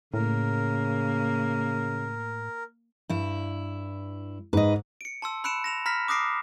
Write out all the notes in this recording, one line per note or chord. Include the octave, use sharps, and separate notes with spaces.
A2 C#3 A#3 A#4
G2 E4
G#2 B4 D#5
C#7 D7
A5 C6 E6
B5 E6 F#6 C#7 D7 E7
A#6 E7 F7
A#5 B5 F6 A#6 B6
D6 D#6 F#6 A#6 C7 D7